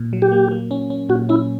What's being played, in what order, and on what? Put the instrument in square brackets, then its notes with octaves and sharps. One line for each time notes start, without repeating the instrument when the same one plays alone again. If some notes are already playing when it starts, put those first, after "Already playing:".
Already playing: [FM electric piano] A#2
F#3
[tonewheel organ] G4
[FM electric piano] A#3
A#3
C#4
C#4
[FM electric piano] A#2 [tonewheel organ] F#4
[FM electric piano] C#4 [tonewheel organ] E4